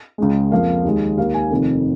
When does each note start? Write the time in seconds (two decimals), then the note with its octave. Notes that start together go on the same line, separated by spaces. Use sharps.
0.18 C#2 C#3 G#3
0.51 F2 F3 A#3 F5
0.85 D#2 D#3 G#3
1.18 D#2 D#3 A#3 F5
1.34 G#5
1.50 F1 F2 D#3